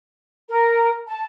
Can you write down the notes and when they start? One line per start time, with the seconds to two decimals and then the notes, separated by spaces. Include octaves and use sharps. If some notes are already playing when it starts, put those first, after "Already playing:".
0.50 A#4
1.07 A5